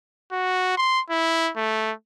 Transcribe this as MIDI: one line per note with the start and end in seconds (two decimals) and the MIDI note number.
0.32 0.74 66
0.77 1.00 84
1.10 1.51 64
1.56 1.92 57